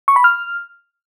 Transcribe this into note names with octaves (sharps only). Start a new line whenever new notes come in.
C#6
B5
F6